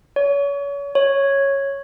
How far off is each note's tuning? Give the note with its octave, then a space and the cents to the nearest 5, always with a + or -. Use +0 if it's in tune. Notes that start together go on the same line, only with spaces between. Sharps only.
C#5 +35
C#5 -5